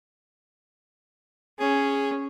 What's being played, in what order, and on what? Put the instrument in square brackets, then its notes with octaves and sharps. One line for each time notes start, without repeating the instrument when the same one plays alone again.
[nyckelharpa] C#4 [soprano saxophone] G#4